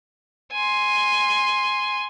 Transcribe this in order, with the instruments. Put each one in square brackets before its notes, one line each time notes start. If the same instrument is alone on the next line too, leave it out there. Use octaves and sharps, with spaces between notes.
[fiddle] G#5 C6